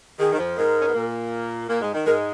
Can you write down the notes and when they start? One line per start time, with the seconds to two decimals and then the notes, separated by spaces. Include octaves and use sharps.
0.19 D#3 G#4
0.33 D#3
0.38 F2 F3
0.57 G#2 G#3 A#4
0.80 C#4
0.87 B3
0.94 A#2 A#3
1.69 A#2 A#3
1.81 G#2 G#3
1.94 D#3
2.06 G#2 G#3 A#4